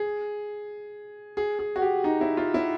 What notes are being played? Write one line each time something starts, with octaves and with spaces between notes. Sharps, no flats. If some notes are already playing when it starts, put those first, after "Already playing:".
Already playing: G#4
G#4
G#4
F#4
G4
D#4
E4
F4
E4